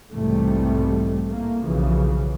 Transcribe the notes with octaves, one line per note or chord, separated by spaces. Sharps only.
B1 E2 G#2 C3 G3 A3
A2 A3 A#3
B1 C#3 E3 F3